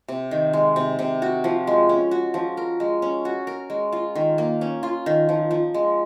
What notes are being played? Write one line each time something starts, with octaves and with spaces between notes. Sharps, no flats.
C3
D#3
G#3
C3
C3
F#4
F3
G#3
C#4
F#4
F3
A#4
G#3
C#4
F#4
A#4
G#3
F4
D#3
A#3
C#4
F4
D#3
F3
F3
G#3